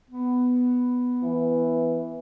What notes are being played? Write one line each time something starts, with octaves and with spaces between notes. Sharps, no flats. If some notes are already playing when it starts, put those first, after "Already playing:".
B3
E3